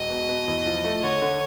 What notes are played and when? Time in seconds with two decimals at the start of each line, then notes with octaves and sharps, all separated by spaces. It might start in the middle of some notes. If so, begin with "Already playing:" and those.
Already playing: E1 D#5
0.10 B2
0.29 B2
0.48 E2
0.66 F3
0.84 A3
1.03 D3 C#5
1.22 D3